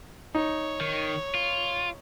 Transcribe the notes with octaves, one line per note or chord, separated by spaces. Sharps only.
D#4 C#5
D#3
F4